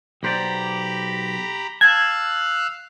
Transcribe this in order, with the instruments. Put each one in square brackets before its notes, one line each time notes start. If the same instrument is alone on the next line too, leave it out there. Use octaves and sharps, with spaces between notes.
[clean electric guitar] B1 C5 D5 [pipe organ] G4 A#5 B5
[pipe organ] F5 E6 F#6 [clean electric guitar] A5 [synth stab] G#6